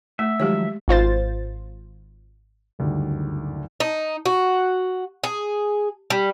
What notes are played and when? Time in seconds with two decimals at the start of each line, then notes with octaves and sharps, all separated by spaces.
0.19 A3 E5
0.40 D#3 F3 F#3 G#3 G4 C#5
0.88 G#1 F4 C5 A6
2.79 F#1 D2 G2 D#3
3.80 D#4
4.26 F#4
5.24 G#4
6.10 G3